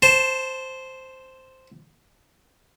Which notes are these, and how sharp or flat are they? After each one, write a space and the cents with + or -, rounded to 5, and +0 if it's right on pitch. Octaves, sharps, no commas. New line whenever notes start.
C5 +0 A5 +0